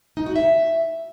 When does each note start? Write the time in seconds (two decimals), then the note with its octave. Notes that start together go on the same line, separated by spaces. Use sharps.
0.17 D#4
0.26 F#4
0.36 E5